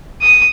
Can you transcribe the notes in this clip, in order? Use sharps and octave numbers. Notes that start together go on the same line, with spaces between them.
D#6